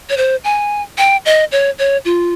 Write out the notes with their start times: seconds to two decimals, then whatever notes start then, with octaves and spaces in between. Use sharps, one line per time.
0.10 C#5
0.17 C5
0.44 G#5
0.98 G5
1.26 D#5
1.52 C#5
1.79 C#5
2.05 F4